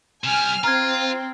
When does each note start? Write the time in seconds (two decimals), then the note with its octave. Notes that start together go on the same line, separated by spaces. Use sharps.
0.24 C3 G3 G#5 F6
0.64 C4 F4 A#5 F6 G#6